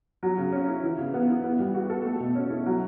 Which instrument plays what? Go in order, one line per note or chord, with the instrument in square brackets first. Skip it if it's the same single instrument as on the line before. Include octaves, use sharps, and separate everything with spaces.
[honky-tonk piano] F#3
C#3
C#4
E4
E3
C#3
B3
E4
B3
G3
F#4
A4
A3
B2
C#4
E4
F#3